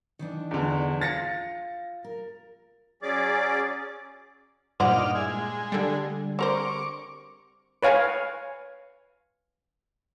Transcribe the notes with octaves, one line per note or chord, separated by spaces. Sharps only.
D#3 E3 D4
E2 D3
F4 A6 A#6 C#7
A#4
F#3 C#4 G#4 D5 D6
G2 A#2 A#3 D#4 C5 D5 F#5 F6
E4 G#4
G#3
D3 G3
C4 A#4 C5 C#6 D6
B4 C#5 F5 G#5